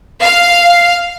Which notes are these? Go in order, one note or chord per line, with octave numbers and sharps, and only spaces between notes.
F5